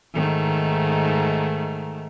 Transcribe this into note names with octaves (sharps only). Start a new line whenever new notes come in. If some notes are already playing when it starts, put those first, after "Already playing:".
G#2 D#3 A3